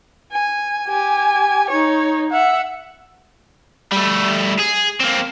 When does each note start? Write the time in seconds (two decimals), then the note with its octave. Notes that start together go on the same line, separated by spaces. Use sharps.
0.31 G#5
0.87 G4 G#5
1.70 D#4 C#5
2.30 E5 F#5
3.92 G3 A3
4.59 G#4
5.00 A#3 C4